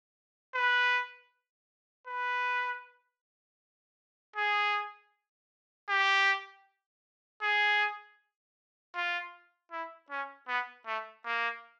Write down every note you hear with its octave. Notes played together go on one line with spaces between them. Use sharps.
B4
B4
G#4
G4
G#4
F4
E4
C#4
B3
A3
A#3